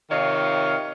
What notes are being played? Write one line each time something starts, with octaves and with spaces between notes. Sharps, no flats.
C3 D#3 F4 C#5 D#5 F5